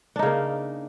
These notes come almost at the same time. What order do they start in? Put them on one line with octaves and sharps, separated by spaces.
D4 D#4 C#3 A#3